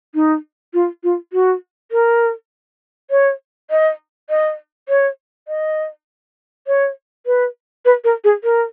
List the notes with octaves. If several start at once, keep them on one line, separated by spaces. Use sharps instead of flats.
D#4
F4
F4
F#4
A#4
C#5
D#5
D#5
C#5
D#5
C#5
B4
B4
A#4
G#4
A#4